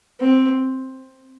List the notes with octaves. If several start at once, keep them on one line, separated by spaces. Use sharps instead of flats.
C4